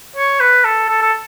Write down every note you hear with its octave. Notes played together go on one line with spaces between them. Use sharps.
C#5
B4
A4
A4
A4